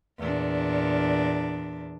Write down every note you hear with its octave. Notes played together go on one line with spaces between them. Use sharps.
E2 A#2 D4